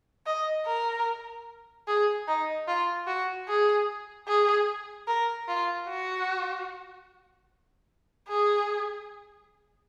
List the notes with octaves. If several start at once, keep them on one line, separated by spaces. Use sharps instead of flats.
D#5
A#4
G#4
D#4
F4
F#4
G#4
G#4
A#4
F4
F#4
G#4